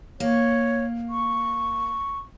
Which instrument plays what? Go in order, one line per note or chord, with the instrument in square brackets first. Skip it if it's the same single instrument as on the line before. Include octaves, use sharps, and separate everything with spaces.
[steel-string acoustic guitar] A#3 [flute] C#5
[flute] C#6